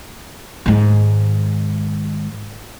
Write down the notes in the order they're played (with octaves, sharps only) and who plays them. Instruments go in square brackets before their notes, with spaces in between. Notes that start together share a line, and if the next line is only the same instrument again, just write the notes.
[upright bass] G#2 D#3